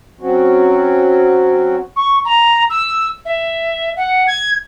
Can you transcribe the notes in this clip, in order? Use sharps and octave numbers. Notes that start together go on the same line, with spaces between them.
F#3 C4 C#4 F#4
C#6
A#5
E6
E5
F#5
G#6